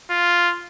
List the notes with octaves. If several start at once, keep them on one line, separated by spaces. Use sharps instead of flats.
F4